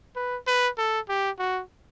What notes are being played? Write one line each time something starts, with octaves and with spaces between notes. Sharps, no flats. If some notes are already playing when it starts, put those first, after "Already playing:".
B4
B4
A4
G4
F#4